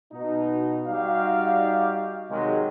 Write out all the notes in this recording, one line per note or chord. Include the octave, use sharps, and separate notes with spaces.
B2 D#4
G3 D#4 F#4 G4 D5 F5
C3 D#3 F#3 G#3